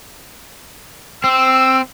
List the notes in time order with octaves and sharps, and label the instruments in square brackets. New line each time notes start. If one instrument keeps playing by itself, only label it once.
[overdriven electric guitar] C4 [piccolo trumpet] E6